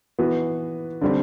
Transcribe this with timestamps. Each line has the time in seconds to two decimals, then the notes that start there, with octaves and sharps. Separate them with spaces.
0.19 E3 B3 F#4
1.01 D3 G3 C4